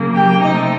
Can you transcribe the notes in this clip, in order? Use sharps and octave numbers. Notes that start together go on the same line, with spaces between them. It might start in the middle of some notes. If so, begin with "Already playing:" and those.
Already playing: C#3 F#3 A#3
G4 G5
C3 F3 A3 D#4 D#5